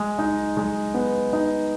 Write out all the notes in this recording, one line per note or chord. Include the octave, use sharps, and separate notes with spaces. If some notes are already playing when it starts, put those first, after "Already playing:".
Already playing: G#3
D#4
G#3
B3
D#4